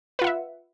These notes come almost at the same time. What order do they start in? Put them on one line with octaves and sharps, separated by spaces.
B4 F4 F#5 E5